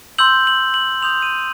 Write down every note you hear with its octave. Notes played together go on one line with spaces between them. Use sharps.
C6 E6 G6 F#7
F#7
F#7
C6 D#6 G6 F7
D#7